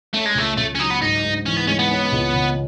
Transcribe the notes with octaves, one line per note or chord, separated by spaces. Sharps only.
A3 C#4
G#3
C#2 A3
C#3 A3
C#4
F#3 D#4
B3
G#2 D#4
G#2
E3 C#4
B3
G#3 C#4
B3
C#4
C#2
C#3